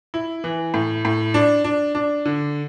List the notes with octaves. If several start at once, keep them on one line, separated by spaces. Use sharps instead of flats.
E4
E3
A2
A2
D4
D4
D4
D3